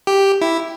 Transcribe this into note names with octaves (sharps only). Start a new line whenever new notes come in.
G4
E4